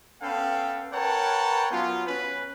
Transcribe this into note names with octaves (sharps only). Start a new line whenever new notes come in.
B3 C#4 A4 B4 F5 G5
A#4 B4 C#5 F#5 G5 A5
F#3 B3 C#4 F4
C#4 B4